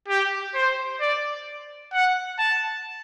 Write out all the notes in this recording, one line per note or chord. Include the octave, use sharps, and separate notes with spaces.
G4
C5
D5
F#5
A5